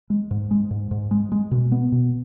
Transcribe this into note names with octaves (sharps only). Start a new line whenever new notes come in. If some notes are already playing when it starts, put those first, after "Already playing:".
G#3
G#2
G#3
G#2
G#2
G#3
G#3
B2
B3
B2